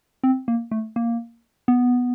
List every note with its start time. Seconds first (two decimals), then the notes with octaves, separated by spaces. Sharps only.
0.24 C4
0.48 A#3
0.71 A3
0.96 A#3
1.68 B3